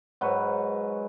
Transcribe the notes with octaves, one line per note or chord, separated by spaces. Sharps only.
G#2 F#3 B4 C#6